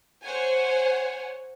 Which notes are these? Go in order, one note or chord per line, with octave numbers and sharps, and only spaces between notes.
C5 C#5 F#5 G#5